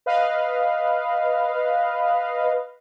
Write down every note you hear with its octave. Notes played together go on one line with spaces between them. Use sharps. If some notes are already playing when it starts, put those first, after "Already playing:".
B4 D#5 F5